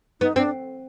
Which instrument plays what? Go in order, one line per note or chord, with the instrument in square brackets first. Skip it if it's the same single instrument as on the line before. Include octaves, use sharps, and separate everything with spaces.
[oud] B3 [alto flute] D#4
[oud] C4 [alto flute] D4